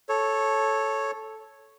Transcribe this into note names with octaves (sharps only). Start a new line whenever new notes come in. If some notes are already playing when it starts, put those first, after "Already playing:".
A4 C#5